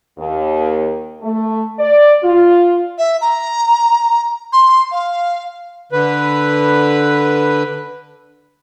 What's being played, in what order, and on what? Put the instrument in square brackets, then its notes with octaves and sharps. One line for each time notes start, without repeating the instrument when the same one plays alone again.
[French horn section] D#2
A3
D5
F4
[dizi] E5
A#5
C6
F5
[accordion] D3 B4